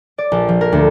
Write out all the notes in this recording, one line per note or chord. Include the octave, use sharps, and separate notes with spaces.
D5
A#1
F3
A#4
D2